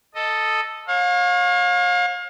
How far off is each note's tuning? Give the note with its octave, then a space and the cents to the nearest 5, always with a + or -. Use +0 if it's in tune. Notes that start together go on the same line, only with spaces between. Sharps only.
A4 +0 D#5 +0
C#5 -25 F5 +35